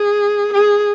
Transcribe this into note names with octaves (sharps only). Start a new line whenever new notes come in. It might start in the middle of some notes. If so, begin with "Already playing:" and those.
Already playing: G#4
G#4